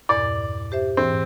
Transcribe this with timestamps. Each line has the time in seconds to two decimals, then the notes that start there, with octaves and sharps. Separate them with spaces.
0.09 E2 G2 A#2 D5
0.72 G4 C5 E5
0.97 G#2 E3 C4